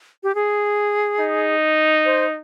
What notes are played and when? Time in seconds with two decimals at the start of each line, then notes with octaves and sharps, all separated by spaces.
0.23 G4
0.35 G#4
1.20 D#4
2.05 C5